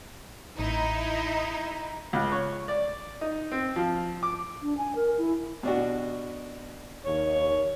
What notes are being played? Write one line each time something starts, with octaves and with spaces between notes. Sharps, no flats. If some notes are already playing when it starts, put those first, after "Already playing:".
A1 D#4 E4
C#2
C#5
D5
D#4
C4
F3
D6
D4
G#5
A#4
E4
B2 D4 F#4
D#2 C#5